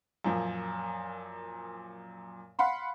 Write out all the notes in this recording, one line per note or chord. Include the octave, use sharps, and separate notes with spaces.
F#2 A#2 F3
F5 F#5 B5 C6